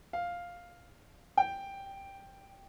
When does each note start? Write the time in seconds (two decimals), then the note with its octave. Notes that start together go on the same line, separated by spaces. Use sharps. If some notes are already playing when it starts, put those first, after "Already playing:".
0.13 F5
1.37 G5